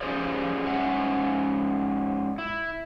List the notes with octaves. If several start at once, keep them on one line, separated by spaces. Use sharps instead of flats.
F3 C#4 G4 G#4 C5 D5
G#2 C#4 E5 F#5
E4